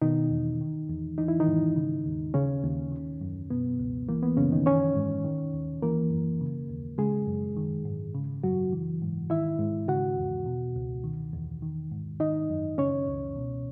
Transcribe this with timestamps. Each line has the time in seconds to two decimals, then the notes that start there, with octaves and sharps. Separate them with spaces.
0.02 B2 D#3 D#4
0.31 E2
0.61 D#3
0.89 E2
1.18 E3 D#4
1.28 E4
1.40 D#3 D#4
1.48 G#2
1.76 C#3
2.06 D#2
2.34 C#3 C#4
2.63 D#2
2.92 D#3
3.21 F#2
3.50 B2 B3
3.79 C#2
4.09 E3 A#3
4.22 B3
4.37 F#2 C#3 C#4
4.52 D#3 D#4
4.66 D#3 C#4 C#5
4.96 G#2
5.24 D#3
5.54 D#2
5.82 E3 A#3 A#4
6.11 F#2
6.40 C#3
6.69 D#2
6.98 C#3 G#3 G#4
7.27 F#2
7.57 D#3
7.85 G#2
8.14 C#3
8.44 F#2 F#3 F#4
8.73 E3
9.02 G#2
9.30 D#3 E4 E5
9.59 G#2
9.88 C#3 F#4 F#5
10.18 E2
10.46 B2
10.76 C#2
11.04 D#3
11.33 E2
11.62 D#3
11.91 G#2
12.20 D#3 D#4 D#5
12.50 F#2
12.78 C#3 C#4 C#5
13.08 C#2
13.36 B2